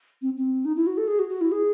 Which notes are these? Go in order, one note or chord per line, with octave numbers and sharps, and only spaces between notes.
C4
C4
D#4
E4
F#4
A4
G#4
F#4
F#4
E4
G#4